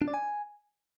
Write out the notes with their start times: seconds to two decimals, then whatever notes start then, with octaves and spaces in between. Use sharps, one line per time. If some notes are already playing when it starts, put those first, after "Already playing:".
0.02 D4
0.08 D5
0.14 G#5